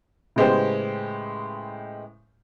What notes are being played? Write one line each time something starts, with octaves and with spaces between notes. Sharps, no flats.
A2 C#3 G#3 B3 G4 C5